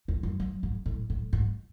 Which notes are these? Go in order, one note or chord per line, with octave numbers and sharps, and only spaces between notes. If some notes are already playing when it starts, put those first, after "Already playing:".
E2
F#2
F#2
G#2
A2
A2
G#2